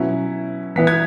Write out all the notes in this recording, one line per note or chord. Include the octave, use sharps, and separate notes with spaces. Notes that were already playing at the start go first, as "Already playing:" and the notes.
Already playing: B2 F#3 C#4 E4
E3 B3 E4 B6
G#6